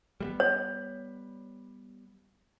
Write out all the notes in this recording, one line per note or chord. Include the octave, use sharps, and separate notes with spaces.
G3 G#3 B3
C#5